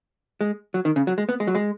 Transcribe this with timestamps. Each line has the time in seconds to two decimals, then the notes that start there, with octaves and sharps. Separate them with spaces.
0.41 G#3
0.74 F#3
0.85 D#3
0.96 C#3
1.07 F#3
1.18 G#3
1.29 B3
1.40 G#3
1.47 F#3
1.54 G#3